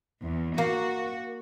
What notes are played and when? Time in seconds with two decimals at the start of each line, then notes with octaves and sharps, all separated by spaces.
0.23 E2
0.58 A#3 F#4